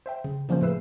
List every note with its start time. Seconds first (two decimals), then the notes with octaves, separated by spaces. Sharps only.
0.06 C5 E5 G5
0.24 C#3
0.49 C#3 F3 A#3 C#4 C5
0.61 A2 A3 G#4 B4 E6 C7